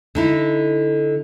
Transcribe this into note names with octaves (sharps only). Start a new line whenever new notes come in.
D3 D#4 E4